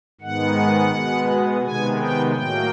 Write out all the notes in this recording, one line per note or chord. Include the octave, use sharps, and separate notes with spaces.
G#2 D#3 G#3 B3 F#5
B2 G#3 B3
C3 D#3 G#3 B3 G#5
G5
A2 F#3 A#3 G5